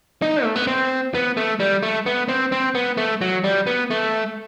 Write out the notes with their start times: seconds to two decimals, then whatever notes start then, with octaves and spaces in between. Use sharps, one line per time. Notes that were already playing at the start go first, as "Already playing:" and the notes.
0.22 D#4
0.44 A3
0.56 B3
0.67 C4
1.14 B3
1.37 A3
1.60 G3
1.83 A3
2.06 B3
2.29 C4
2.52 C4
2.75 B3
2.97 A3
3.21 F#3
3.44 G3
3.67 B3
3.91 A3